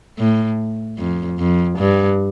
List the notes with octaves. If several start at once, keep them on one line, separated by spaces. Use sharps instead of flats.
A2
F2
F2
G2